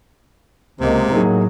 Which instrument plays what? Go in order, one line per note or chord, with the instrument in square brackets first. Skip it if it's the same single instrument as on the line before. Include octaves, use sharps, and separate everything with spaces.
[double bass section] C#2 G#3 A#3 [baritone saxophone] C3
[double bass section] A2 F#3 [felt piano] A#3 D#4 G#4